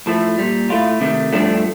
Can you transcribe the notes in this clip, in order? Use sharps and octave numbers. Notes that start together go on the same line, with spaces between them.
A2 F3 A3 A4
A#2 G3
A2 A3 F4
C3 D#3 A3
G2 F3 A3 D4